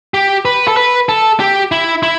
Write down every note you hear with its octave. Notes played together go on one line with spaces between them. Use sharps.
G4
B4
A4
B4
A4
G4
E4
E4